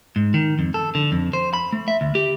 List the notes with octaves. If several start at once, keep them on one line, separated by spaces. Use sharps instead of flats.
G#2
D#3
F2
A4
D3
F2
C5
B5
A3
E5
D2
G4